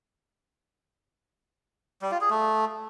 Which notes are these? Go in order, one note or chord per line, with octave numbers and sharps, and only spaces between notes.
G3
F4
G#4
A3